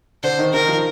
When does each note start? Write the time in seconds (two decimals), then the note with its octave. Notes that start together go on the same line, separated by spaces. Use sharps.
0.23 D3 D4 C5
0.38 D#3 D#4
0.53 D#3 D#4 A#4
0.69 F3 F4